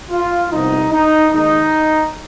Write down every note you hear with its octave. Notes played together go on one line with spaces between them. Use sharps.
F4
C2 C3 F3 B3 D#4
D#4
D#2 D#3 G#3 D#4